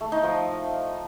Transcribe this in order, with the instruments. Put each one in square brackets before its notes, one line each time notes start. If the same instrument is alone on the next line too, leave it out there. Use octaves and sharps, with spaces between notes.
[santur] A3
D#4
F3